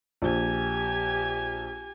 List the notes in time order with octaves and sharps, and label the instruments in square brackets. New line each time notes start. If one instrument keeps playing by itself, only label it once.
[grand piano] A#1 [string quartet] G4 G#5 G#6